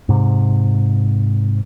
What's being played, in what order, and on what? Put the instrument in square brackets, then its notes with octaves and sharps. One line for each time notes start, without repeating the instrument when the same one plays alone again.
[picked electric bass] G#2 C3